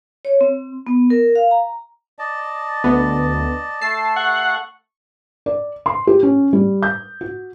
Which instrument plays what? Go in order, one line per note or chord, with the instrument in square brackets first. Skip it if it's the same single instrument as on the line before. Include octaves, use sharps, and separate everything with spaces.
[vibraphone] C#5
C4
B3
A#4
F5
A#5
[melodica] D5 D#5 A5
[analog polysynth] D2 [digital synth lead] B3
[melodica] A3 A4 [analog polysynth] A5 [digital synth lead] C7
[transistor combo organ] F#5 [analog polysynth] C#6
[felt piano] D5
C6
G4
C#4
G3
G6
F#4